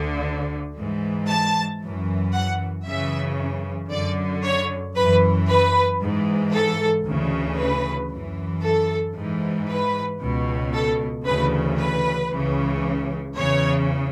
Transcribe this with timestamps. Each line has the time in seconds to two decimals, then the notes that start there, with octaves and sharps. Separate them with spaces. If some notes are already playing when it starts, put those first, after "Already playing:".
Already playing: D2 D3
0.76 G#2 E3
1.28 A5
1.82 F#2 E3
2.33 F#5
2.86 F#2 C#3 E3 E5
3.91 F#2 D3 D5
4.44 C#5
4.96 F#2 E3 B4
5.48 B4
6.01 G#2 E3
6.53 A4
7.07 D2 C#3 E3
7.58 B4
8.11 F#2 E3
8.63 A4
9.16 G#2 E3
9.69 B4
10.21 C#2 B2
10.73 A4
11.26 D2 C#3 E3 B4
11.78 B4
12.30 C#2 C#3 E3
13.36 E2 C#3 E3 C#5